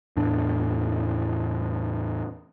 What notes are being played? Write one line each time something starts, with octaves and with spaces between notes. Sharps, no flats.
E2 A2 D4